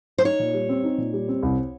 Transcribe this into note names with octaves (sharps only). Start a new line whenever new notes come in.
C5
D#4 C#5
A#2
G3
C4
D#4
A#2
G3
C4
C2